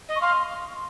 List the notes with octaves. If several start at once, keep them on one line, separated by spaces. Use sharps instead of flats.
D#5
C#6
F5 C6